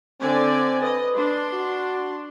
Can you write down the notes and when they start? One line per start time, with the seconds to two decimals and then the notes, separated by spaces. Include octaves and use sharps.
0.21 D3 C4 D5 G#5
0.82 B4 D#5
1.16 D4 C6
1.53 F#4